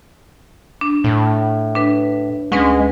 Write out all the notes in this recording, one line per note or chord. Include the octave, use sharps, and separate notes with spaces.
D4
A2
D4 B4
D2 G#3 C#4 B4